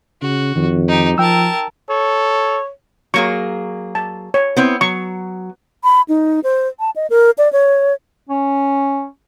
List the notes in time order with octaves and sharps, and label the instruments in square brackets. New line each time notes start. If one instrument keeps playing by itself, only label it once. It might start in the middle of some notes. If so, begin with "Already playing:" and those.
[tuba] C#3 [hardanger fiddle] F#4
[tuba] F2 [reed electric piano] D#3
[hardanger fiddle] D#4 G4
[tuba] F3 [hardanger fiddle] A#4 A5 [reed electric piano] G5 E6
[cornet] A4 [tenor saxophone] C#5
[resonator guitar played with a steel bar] F#3 A#3 G#4 [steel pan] C#6
[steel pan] A5
C#5
[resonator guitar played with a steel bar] B3 C4 E4
[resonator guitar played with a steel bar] F#3 [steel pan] C#6
[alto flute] B5
D#4
C5
A5
D#5
A#4
D5
C#5
[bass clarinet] C#4